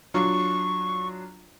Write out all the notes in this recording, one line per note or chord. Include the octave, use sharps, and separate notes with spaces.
F#3 D4 F4 C#6